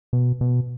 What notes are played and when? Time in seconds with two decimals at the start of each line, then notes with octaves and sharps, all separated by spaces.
0.13 B2
0.41 B2